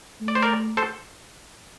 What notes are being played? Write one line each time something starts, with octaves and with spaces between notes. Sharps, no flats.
A3
D5
C5
A#4 D5
A4 C5